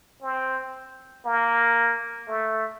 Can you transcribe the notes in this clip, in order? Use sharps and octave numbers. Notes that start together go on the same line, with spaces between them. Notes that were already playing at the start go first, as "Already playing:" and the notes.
C4
A#3
A3